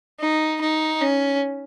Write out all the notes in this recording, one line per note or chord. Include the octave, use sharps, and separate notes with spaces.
D#4
D#4
C#4